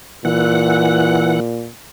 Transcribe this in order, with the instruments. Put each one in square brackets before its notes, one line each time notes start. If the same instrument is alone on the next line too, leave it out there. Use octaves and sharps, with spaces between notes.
[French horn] A#2 [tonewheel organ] E3 F#5